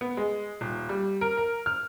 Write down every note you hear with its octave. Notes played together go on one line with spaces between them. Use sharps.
B3
G#3
D#1
G3
A#4
A#4
F6